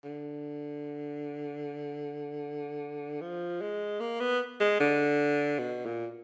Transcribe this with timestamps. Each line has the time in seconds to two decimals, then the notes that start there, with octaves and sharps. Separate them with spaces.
0.04 D3
3.21 F3
3.61 G#3
4.00 A#3
4.20 B3
4.60 G#3
4.80 D3
5.59 B2
5.86 A#2